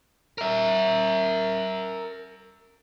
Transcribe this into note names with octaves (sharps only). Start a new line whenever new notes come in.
A#4 E5